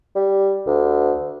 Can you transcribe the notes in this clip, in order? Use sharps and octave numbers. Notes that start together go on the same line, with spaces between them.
G3
D2